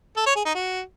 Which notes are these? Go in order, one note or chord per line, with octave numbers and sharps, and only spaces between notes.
A4
C#5
G#4
D#4
F#4